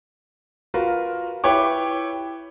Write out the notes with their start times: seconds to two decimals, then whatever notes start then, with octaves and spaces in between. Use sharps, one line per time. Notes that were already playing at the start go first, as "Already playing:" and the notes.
0.74 F4 F#4 A#4 B4
1.44 E4 G4 B4 C#5 G5 D6